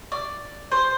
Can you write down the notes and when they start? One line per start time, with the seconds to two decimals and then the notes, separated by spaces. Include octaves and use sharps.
0.12 D5
0.72 C5